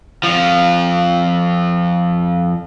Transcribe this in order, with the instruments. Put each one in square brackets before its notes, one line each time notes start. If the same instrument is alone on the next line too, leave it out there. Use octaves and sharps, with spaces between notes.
[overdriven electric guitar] F2 F3